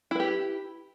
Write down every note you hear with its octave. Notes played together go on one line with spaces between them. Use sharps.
E4 G4 B4